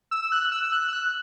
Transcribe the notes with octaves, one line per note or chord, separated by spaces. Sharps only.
E6
F#6
E6
F#6
E6
F#6